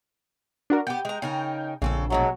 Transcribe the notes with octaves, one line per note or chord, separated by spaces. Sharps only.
D4 F#4 A#4
B3 G4 G5
G#3 A#5
C#3 D#4 A#4
A#1 C#3 C4 A4
B2 F#3 G#3 A4